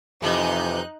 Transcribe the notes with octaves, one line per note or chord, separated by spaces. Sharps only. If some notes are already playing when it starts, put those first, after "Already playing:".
F2 C3 E3 D#4 F#6 G6